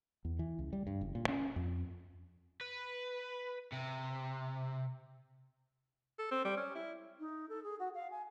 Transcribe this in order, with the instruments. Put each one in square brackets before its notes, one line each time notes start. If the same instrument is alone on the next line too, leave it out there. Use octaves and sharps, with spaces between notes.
[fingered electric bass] E2
E3
C#2
G3
G2
F#1
A#2
C#4
F2
[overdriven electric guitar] B4
C3
[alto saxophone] A4
C4
G3
C#4
E4
[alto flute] D#4
A4
G#4
F#4
F5
G#5